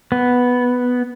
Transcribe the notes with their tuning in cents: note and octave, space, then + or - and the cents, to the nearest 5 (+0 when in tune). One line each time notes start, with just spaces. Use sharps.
B3 +0